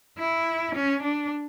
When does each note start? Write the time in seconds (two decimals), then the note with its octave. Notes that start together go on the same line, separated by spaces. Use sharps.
0.18 E4
0.75 C#4
1.03 D4